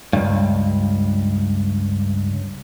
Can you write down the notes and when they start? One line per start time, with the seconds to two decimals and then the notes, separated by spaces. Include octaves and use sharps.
0.13 C#2 G2